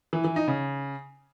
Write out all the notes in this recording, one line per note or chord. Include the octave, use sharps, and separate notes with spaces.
E3
E3
D#4
C#3